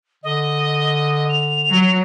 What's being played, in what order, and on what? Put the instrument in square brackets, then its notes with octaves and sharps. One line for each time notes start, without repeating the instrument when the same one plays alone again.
[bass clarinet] D3 [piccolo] D#5
[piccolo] F7
[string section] F#3